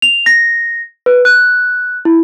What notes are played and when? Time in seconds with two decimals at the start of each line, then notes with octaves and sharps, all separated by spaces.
0.02 F7
0.26 A#6
1.06 B4
1.25 F#6
2.05 E4